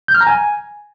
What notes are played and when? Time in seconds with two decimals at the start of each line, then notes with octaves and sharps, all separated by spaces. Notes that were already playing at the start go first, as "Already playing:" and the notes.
0.08 G6
0.15 F6
0.21 A#5
0.27 G#5